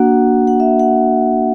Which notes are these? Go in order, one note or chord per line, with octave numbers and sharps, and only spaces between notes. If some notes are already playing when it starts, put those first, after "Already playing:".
Already playing: A#3 D4 F#4 F#5
F#5
E5
F#5